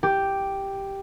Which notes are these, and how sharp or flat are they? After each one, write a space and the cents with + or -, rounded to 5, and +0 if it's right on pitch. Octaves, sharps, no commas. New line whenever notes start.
G4 +0